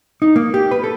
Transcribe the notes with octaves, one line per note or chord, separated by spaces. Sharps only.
D#4
A#3
G4
B4
A4